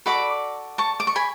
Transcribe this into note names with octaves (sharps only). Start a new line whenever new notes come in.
F#4 A4 D5 B5 D6
A5 C#6
D6
C#6
G#5 B5